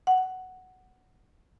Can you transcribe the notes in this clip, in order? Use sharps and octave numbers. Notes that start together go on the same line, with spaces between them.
F#5